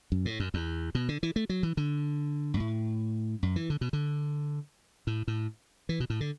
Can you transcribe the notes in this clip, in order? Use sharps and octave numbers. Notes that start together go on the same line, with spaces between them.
F#2
A2
F#2
E2
B2
D3
E3
A3
F#3
E3
D3
F#2
A2
F#2
E3
D3
B2
D3
A2
A2
E3
B2
A2
D3